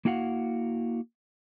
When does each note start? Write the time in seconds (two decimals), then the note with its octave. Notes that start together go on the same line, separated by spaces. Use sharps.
0.05 A#3 E4 F#4 F5 F#5